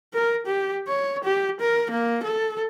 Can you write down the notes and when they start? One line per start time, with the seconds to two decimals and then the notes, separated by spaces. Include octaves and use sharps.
0.13 A#4
0.46 G4
0.87 C#5
1.24 G4
1.60 A#4
1.91 A#3
2.23 A4